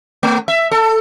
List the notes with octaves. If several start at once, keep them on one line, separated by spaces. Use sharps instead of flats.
A3
E5
A4